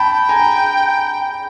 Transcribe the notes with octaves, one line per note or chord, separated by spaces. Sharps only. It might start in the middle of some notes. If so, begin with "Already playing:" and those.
Already playing: G5 A5 B5
G#5 A#5